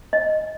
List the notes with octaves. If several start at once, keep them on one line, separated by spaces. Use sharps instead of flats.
D#5